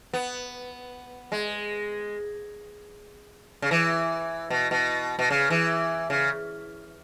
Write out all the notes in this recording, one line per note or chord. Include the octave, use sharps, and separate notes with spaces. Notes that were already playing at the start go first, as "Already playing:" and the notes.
B3
G#3
C#3
E3
B2
B2
B2
C#3
E3
C#3